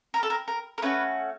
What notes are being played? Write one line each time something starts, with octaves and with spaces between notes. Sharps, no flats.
A#4
A4
A#4
A#4
A#4
A3 C#4 F#4 B4